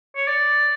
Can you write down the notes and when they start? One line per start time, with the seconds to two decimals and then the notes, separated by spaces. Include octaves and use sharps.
0.16 C#5
0.28 D5